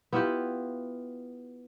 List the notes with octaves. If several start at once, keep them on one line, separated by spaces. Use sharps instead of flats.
B3 E4 F4 G4